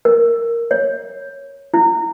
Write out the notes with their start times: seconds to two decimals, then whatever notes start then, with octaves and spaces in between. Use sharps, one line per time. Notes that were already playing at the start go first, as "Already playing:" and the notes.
0.05 A#4
0.71 C#5
1.74 E4